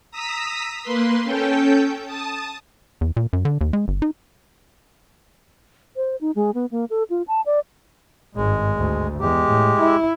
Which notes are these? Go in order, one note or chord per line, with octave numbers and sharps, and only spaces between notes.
A#5 D#6 E6 B6
A#3 B4 C6
C#4 A4 G5 G6
A5 D#6
E2
A#2
F#2
D3
D#2
G#3
G1
D#4
C5
D#4
G#3
B3
A#3
A4
F4
A5
D5
G#1 G2 G#3
D2
E2 G#3 G4
A2
E4